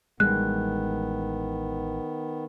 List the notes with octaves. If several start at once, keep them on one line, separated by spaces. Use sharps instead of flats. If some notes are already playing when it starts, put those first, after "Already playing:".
A1 D#3 G3 G#3 B3 F#6